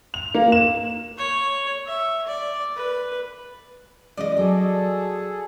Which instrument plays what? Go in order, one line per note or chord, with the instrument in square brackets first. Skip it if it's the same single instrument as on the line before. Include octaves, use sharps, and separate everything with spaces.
[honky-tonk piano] F7
A#3
E7
[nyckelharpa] C#5
E5
D5
B4
[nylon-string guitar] E3 G#3 C#4 [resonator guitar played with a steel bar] D5 D#5
[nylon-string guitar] F#3 [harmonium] G#4 A4